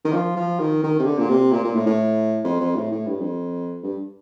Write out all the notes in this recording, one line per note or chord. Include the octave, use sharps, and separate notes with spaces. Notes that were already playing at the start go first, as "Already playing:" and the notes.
D#3
F3
F3
D#3
D#3
C3
D3
A#2
C3
A#2
A#2
A2
A2
F2
F2
A2
A2
G2
F2
G2